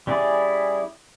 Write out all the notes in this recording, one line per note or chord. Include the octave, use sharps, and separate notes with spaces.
G3 C#4 E4 G#4 D5